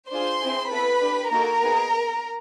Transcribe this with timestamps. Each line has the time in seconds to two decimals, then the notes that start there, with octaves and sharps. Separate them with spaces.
0.11 D4 F4 G#4 C5 C6
0.41 C4 E4 G#4
0.71 B3 E4 A4 B4 B5
1.01 D4 G4
1.31 A#3 D#4 F#4 A4 A#4 A#5
1.62 B3 D#4 G#4